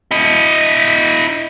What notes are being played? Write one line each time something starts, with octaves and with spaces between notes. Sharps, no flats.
E4 D#5